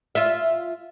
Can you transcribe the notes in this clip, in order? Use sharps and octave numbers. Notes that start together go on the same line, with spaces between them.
F4 E5